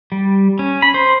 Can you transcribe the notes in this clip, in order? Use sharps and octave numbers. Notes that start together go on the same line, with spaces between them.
G3
C#4
B5
C5